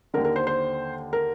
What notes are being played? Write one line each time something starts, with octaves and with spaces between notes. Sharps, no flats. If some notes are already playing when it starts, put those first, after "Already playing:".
D#2 D3 A#4
A#4
C5
C5
A#4